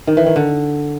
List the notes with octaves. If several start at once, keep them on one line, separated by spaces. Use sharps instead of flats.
D#3
E3
D#3
D3